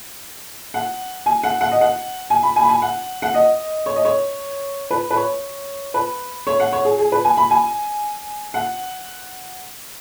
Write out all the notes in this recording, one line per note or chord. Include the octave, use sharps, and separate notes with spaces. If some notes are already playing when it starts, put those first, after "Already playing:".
F#5
G#5
F#5
F#5
D#5
F#5
G#5
B5
G#5
B5
G#5
F#5
F#5
D#5
C#5
D#5
C#5
B4
B4
C#5
B4
C#5
F#5
C#5
G#4
G#4
B4
G#5
B5
G#5
F#5